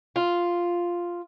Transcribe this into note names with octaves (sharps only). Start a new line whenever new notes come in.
F4